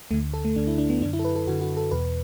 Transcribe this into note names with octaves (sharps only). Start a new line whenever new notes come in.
D2 D3 A3
A4
A3
D2 D3 D4
E4
D4
B3
F#2 D3 D4
E4
A4
B4
A4
F#2 D3 F#4
F#4
A4
E2 B2 B4